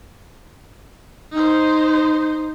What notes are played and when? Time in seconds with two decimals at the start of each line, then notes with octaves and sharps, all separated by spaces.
1.32 D#4 C5